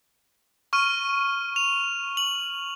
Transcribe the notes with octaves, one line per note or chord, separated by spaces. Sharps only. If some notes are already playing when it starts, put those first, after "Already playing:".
C#6 F6 D#7
F7
F#7